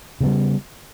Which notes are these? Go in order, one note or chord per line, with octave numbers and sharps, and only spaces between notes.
C#3 G3 B3